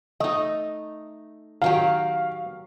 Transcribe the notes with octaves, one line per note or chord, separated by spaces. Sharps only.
A3 D#4 D#5
D#3 F#3 G4 F5